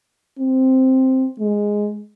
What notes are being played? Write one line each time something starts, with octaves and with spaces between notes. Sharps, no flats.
C4
G#3